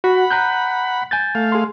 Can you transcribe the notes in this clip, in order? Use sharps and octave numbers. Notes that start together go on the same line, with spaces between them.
F#4 F#5 B5
A#5 F#6 G6
G#5 G6 A6
A3 F5
G#4 C6